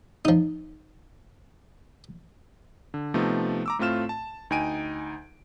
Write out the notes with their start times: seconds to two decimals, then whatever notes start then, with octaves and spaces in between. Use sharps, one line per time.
0.25 F3 D#4
2.94 D3
3.14 C3 F3 A3 B3 D#4
3.66 A#5 D6 E6
3.79 A2 A3 C4 F4 F6 E7
4.09 A5
4.50 D2 D#4 G5 G#5 D7 D#7